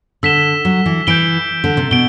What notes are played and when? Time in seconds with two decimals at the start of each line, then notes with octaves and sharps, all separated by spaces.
0.23 D3 E6 B6 E7 G7
0.65 F#3
0.86 E3
1.07 E3 G6 D7 G7
1.64 D3
1.77 C3
1.91 B2 D7 G7